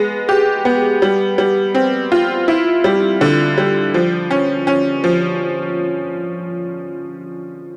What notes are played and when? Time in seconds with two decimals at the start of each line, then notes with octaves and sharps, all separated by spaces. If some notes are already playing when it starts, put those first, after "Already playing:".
Already playing: G#3 B3
0.29 G4
0.65 B3
1.02 G3
1.38 G3
1.75 C4
2.12 F4
2.48 E4
2.84 G3
3.21 D3
3.58 G3
3.94 F3
4.31 C#4
4.67 C#4
5.04 F3